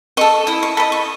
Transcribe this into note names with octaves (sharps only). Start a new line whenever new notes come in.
A4 D#5 C#6
E4 D#6
C#6
A4 D#5 B5
C#6